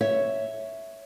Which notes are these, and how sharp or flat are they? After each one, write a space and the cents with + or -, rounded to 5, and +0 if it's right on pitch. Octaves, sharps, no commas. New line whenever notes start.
C#5 +0 E5 +0